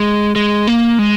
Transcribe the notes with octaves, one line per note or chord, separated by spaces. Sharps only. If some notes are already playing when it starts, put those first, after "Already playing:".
Already playing: G#3
G#3
A#3
G#3